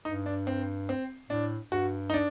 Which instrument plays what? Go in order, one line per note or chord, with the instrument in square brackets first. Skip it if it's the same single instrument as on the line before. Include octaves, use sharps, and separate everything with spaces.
[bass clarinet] G2 [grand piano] D#4
[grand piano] D4
C4
C4
[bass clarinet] A2 [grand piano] D4
[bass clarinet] G2 [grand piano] F#4
[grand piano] D#4
D4